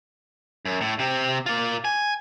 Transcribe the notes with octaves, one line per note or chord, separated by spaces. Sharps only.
F#2
A2
C3 C4
A#3 F4
G#5